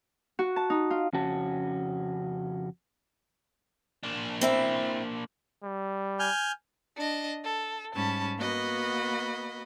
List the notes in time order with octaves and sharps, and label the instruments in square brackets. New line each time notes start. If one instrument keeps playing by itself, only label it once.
[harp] F#4
A5
D#4
F4
[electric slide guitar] F2 C#3 C#4 F#4 A5
[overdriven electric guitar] A#3 D4
[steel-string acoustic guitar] C4 E4 E5
[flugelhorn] G3
[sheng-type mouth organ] G#5 F6 G6
[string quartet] D4 D#5
A4
G#2 G3 C#4 A5 B5
A#3 B3 F#4 D#5 B5